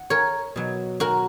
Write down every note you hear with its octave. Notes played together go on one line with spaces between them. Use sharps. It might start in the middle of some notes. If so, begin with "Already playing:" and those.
Already playing: F#5
A#4 C#5
B2 F#3
F#4 A#4